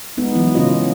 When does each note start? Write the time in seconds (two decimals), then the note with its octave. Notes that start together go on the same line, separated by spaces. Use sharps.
0.17 G#3 B3 D#4
0.35 E3 F#3 E4
0.55 C#3 C#4 F4 D#5